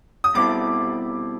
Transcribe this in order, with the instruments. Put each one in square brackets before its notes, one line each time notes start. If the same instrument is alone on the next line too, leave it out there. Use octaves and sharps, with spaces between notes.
[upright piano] D#6
[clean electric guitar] B2 G3 C4 E4 A4 [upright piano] D6